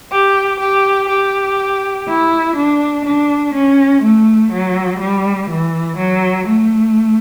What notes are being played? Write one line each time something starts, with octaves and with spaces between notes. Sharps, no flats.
G4
G4
G4
E4
D4
D4
C#4
A3
F#3
G3
E3
F#3
A3